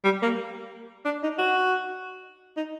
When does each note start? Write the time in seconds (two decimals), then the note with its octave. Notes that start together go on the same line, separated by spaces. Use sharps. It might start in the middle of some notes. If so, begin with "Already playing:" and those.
0.05 G3
0.22 A#3
1.05 D4
1.23 D#4
1.39 F#4
2.57 D#4